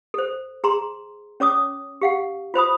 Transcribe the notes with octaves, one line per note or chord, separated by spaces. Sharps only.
A4 C5
G#4 A#5 C6
C#4 C#5 D6 D#6
G4 F5 F#5
F4 C5 B5 D#6